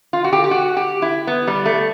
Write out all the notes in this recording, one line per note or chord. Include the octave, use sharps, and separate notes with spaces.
F4
F#4
G4
G4
F#4
G4
E4
B3
G3
A3